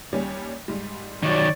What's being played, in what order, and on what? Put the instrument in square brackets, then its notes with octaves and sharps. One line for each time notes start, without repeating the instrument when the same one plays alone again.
[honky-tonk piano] D#2 G3 C#4
G#2 G3
[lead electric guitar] D#3 F#3 [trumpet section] C#5 D5